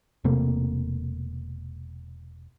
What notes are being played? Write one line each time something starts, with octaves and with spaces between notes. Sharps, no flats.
E1 C3 A3 A#3